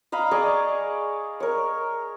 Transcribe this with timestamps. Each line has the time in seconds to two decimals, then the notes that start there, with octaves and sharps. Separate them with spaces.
0.12 D#5 F5 A#5 B5
0.31 G#4 D5 D#5 C#6
1.40 A#4 C#5